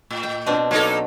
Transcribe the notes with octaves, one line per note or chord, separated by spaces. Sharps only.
A2
G5
B2 C4 D4
F#3 A#3 D#4 A4